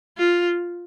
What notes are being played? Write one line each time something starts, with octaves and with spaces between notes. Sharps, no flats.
F4